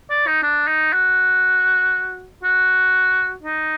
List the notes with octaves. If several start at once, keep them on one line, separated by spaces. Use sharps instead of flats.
D5
D#4
D4
D#4
F#4
F#4
D#4